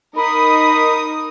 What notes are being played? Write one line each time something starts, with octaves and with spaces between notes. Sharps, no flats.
D#4 A#4 B5 D#6